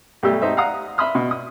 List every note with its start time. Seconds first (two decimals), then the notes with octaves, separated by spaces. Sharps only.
0.23 B1 G3 A3 G4 E6
0.42 G#1 D#4 C5 E5
0.57 F5 F#5 A#5 D#6
0.98 E5 B5 C6 D#6 F6
1.15 B2
1.31 D#6